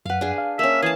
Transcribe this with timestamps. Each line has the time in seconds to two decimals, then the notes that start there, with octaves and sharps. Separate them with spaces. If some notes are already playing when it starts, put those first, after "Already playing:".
0.06 F#2 B4 F5 F#5
0.21 D4 G#4
0.38 F5
0.59 A#3 C#4 E5
0.82 E3 G#4 A5